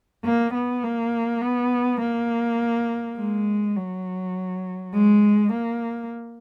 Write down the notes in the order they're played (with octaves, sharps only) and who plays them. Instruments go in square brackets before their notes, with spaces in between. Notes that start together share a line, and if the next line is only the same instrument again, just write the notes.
[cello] A#3
B3
A#3
B3
A#3
G#3
F#3
G#3
A#3